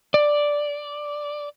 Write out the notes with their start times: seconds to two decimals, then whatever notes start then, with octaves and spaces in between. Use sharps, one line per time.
0.14 D5